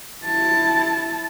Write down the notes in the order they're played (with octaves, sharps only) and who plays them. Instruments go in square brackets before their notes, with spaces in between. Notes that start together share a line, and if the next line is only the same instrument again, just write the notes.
[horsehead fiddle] E4 A5